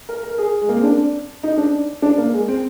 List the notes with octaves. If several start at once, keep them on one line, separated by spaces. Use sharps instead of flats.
A#4
A#4
G#4
G#3
A#3
C4
D4
D#4
D4
D4
A#3
G#3
C4